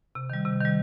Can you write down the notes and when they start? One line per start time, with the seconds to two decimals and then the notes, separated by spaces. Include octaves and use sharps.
0.15 C3
0.30 D#3 G3
0.46 C3
0.61 D#3 G3